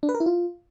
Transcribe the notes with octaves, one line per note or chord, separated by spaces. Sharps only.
D4
B4
A#4
E4
F4